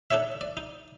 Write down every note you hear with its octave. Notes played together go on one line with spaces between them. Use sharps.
D4 D#4 A4 C#5 E5
D5
D#4